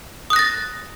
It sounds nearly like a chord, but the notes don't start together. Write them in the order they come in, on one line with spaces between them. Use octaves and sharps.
D#6 F#6 A#6 A6